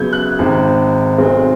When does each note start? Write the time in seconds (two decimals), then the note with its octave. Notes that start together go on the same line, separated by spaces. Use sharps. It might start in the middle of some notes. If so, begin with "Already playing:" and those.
Already playing: F#2 C#3 F#3 B3 G6 G#6
0.13 F#6
0.39 G#1 G#2 D#3
1.18 B1 B2 G#3 C4